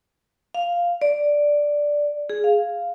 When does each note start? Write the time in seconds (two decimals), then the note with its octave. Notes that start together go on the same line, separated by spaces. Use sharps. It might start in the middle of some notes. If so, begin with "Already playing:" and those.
0.54 F5
1.02 D5
2.30 G#4
2.44 F5